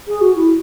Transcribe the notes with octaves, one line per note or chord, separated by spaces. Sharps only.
G#4
F#4
E4